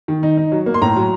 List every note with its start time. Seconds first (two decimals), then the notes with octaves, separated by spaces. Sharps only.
0.08 D#3
0.23 D#4
0.37 D#4
0.52 F#3
0.66 A#3
0.74 C6
0.82 A2 A#5
0.96 F#3